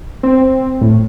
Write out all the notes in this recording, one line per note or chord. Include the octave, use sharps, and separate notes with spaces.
C4
A2